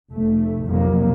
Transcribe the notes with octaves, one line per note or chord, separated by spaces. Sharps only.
F1 A3
B1 F2 C3 F3 F#3 A#3